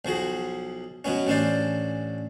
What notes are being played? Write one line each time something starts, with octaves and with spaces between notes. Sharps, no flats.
B1 F3 F#4 G#4
B2 F#3 B3 C#4
A1 C#4 D4 C5 D5